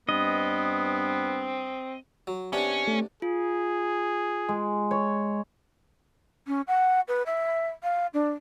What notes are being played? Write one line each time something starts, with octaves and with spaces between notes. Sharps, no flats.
G2 B3 C4 D#5
F#3
C3 B3 C#4 D4
A3
F4 G#4
G#3
C#5
C#4
F#5
B4
E5
F5
D4